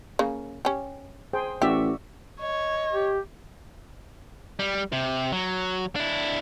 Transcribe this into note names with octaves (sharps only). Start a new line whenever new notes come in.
C#3 A#3
C#4 G4
G#4 C5 G5
A1 F#4 G4 D5 E5
C#5 D#5
G4
G3
C3
F#3
D4 E4